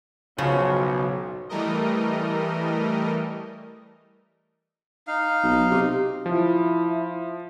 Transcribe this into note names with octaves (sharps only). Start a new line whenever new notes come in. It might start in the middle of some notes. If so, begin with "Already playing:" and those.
B1 C#3 F3 F#3 C#4 F4
E3 G3 A3 A#4 D#5
D#4 F5
B1
C3
F3 E4